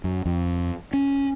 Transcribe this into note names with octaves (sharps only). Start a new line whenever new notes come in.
F#2
F2
C#4